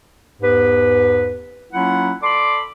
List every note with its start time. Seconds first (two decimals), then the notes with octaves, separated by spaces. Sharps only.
0.41 E2 G#2 B3 G4 B4
1.73 F#3 A#3 C#4 E4 F4 F#5
2.23 A4 D5 B5 C6 D6